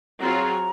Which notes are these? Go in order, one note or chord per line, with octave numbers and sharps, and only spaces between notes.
F#3 C4 F4 G#4 C#5 A#5